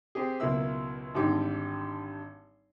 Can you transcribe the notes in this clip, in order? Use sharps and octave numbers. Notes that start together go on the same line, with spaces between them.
C4 G4 G#4
C#2 B2 F#3 A#3 E4 E6
G#1 G#2 D3 G3 D#4 D6